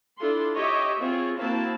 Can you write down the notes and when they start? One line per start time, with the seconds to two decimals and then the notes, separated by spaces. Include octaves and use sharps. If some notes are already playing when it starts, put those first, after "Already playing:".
0.19 D4 E4 F4 A4 C6
0.55 G4 C#5 D#5 E5
0.99 C4 F4 G#4 C#5
1.39 A#3 C4 E4 F#4 F5 A5